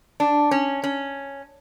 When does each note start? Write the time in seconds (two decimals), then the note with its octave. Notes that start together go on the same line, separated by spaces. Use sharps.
0.20 D4
0.51 C#4
0.84 C#4